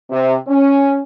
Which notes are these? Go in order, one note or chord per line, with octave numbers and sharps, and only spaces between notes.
C3
C#4